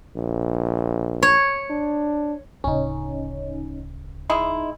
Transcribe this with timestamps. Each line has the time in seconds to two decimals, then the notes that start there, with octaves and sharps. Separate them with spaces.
0.16 A#1
1.23 C#5
1.70 D4
2.64 D1 C#3 C#4 D#4
4.30 G#3 D#4 E4